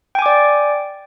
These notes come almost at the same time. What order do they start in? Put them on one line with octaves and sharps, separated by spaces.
G5 G#5 D6 D5